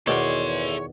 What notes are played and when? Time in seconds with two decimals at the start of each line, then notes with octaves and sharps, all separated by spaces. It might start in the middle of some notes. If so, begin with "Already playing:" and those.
0.07 E2 B2 D#3 A4 C#5 D5 C6